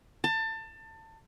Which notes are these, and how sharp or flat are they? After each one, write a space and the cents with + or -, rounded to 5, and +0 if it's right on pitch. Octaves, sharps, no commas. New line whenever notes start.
A5 +25